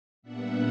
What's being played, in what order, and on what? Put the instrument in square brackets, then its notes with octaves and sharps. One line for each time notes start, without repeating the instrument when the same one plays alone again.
[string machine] A#2 G3 B3 D4 E5 F#5